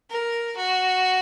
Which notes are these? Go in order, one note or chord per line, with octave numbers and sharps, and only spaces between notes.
A#4
F#4